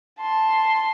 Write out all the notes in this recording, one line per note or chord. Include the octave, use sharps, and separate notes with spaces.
A5 C6